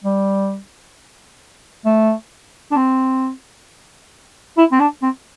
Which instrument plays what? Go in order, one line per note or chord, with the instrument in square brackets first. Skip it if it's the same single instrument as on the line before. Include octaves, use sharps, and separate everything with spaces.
[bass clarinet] G3
A3
D4
C4
E4
C4
D4
C4